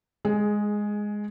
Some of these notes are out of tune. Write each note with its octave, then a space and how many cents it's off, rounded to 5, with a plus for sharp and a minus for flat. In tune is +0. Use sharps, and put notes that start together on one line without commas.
G#3 +0 G#4 +15